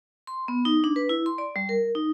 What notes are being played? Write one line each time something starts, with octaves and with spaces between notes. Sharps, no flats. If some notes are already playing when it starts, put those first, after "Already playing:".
C6
B3
D#4
D4
B4
E4
C6
D5
G3
A#4
D#4